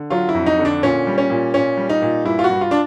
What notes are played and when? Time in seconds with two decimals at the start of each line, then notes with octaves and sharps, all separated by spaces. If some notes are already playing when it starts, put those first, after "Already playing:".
Already playing: D3
0.10 F#3 F4
0.29 E4
0.34 F2
0.46 D#4
0.59 D3
0.65 D4
0.83 A#2 C#4
1.07 G3
1.18 C#4
1.30 A#2
1.54 A#2 C#4
1.77 G3
1.89 D#4
2.02 A#2
2.25 G2 E4
2.39 F4
2.44 F#4
2.50 G2
2.61 F4
2.71 D4